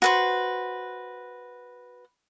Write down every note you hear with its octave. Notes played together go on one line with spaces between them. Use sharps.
F#4 B4 C5